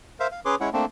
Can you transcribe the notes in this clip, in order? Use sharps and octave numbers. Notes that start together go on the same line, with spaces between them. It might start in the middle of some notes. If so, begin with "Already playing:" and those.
A#4 C5 E5 F5
F5
C#4 G#4 B4 C#5 C6 D6
G#3 C#4 E4 C#5 F#5
A3 A#3 C4 D4